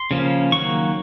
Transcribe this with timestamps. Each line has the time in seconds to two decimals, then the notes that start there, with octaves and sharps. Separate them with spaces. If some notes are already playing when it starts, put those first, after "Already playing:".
Already playing: C6
0.11 C#3 F3 A#3 C#4
0.52 D#3 F#3 A#3 C#6